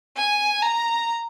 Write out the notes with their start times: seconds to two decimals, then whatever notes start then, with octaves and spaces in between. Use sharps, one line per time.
0.17 G#5
0.62 A#5